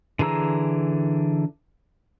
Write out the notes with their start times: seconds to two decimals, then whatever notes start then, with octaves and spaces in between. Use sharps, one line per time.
0.19 D3 E3 G#4 A#5 E6